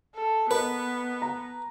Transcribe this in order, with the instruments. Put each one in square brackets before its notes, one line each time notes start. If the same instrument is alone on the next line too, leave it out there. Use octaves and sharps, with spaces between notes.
[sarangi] A4
[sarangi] B3 [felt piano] A#4 D#5 [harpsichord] B4
[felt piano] A#5